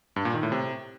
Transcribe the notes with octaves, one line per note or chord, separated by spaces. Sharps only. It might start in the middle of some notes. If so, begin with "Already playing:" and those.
G2
A#2
D#3
A2
C3